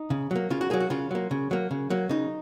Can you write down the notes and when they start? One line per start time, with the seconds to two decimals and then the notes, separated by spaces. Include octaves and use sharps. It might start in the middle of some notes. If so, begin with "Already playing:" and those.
Already playing: D#4
0.10 C#3
0.31 F#3 A#3
0.50 C#3 F4
0.61 F#4
0.70 F#3 A#3 G#4
0.80 F#4
0.90 C#3 F4
1.11 F#3 A#3
1.31 C#3
1.51 F#3 A#3
1.71 C#3
1.90 F#3 A#3
2.09 C#3 D#4